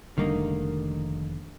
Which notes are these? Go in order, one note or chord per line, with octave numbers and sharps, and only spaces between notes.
F1 D3 D#3 G3 A3 A#3 D#4